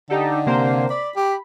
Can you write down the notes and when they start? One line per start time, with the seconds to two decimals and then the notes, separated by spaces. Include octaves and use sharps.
0.10 D3 D#4 G4 A4
0.46 C3 A#3 C5
0.90 D5 B5
1.16 G4